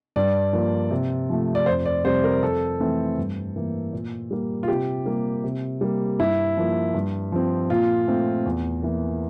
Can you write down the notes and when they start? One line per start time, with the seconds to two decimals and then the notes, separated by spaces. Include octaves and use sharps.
0.16 G2 D5
0.53 F3 A#3
0.91 C3
1.30 F3 A3
1.55 D5
1.66 F2 C5
1.85 D5
2.05 C3 G3 C4 C5
2.24 A#4
2.42 F2 A4
2.80 E3 A3 C4
3.17 G2
3.56 E3 A#3
3.93 A#2
4.31 G3 A#3
4.63 F4
4.68 C3 G4
5.06 G3 A#3
5.44 C3
5.81 G3 A#3
6.19 G2 E4
6.57 F3 A#3
6.94 G2
7.32 F3 C4
7.70 A#2 F4
8.07 A3 C4
8.46 E2
8.82 E3 A#3